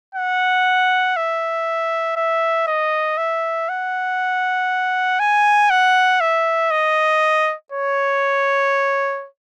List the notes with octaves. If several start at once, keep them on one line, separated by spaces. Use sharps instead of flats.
F#5
E5
E5
D#5
E5
F#5
G#5
F#5
E5
D#5
C#5